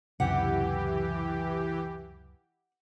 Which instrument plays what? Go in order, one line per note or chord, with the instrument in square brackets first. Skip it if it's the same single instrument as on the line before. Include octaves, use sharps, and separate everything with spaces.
[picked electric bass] C#2 F#2 C3 [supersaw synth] E3 G4 [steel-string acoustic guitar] F#5